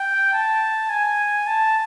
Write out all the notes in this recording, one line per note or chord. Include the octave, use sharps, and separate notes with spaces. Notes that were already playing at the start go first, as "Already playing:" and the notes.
Already playing: G5
A5
G#5
A5